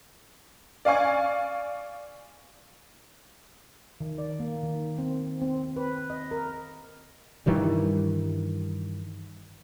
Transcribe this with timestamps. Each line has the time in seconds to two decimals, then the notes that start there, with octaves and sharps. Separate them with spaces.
0.85 D5 F5 G#5 C#6 G#6
4.01 D#3
4.18 D5
4.40 A#3
4.63 D#3
4.98 C4
5.42 C4
5.76 B4
6.10 D#5
6.31 A#4
7.46 G2 D#3 E3 G3